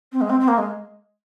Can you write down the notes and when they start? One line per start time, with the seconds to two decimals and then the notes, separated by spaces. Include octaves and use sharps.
0.12 C4
0.21 G#3
0.29 C4
0.40 C4
0.48 A#3
0.57 G#3